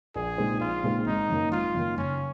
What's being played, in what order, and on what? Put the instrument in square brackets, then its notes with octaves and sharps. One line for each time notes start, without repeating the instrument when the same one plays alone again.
[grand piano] A#1 [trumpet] G#4
[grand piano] A#2 G#3 C4 D#4
[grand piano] A#1 [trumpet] F4
[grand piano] A#2 G#3 C4 D#4
[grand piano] G#1 [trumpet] D#4
[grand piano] F#2 D#3 A#3
[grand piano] G#1 [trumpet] F4
[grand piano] F#2 D#3 A#3
[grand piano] F#1 [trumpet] C#4